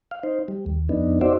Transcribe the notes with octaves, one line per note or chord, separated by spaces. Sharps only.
F5
D#4 C5
G3
D#2
F2 B3 D4 D#4
D#4 F#4 C5 D5 E5